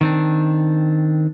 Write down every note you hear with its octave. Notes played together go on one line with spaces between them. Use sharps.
D#3 C4 D4